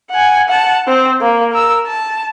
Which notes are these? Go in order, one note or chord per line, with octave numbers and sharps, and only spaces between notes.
F#5 G#5
F#5 A5
C4 C5
A#3
A#4 E6
A5